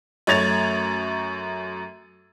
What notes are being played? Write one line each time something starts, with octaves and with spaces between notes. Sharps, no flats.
F#2 A3 C#5 G#6 A6 F7